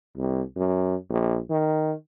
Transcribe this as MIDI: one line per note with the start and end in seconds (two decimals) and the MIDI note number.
0.17 0.42 36
0.56 0.95 42
1.10 1.38 34
1.50 1.94 51